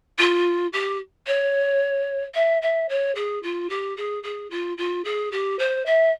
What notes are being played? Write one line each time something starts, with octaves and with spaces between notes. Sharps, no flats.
F4
G4
C#5
E5
E5
C#5
G#4
F4
G4
G#4
G#4
F4
F4
G#4
G4
C5
E5